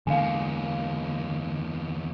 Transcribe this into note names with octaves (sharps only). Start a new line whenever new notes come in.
E2 D3 G#3 A#3 F5 G#5